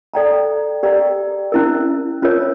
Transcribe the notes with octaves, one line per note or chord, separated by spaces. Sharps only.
A4 D5 G5 A#5
G4 A#4 D5 G5 A#5
C#4 E4 A#4
C#4 F4 A#4 C#5